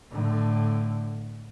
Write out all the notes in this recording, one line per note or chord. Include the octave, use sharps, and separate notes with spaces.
A2 D3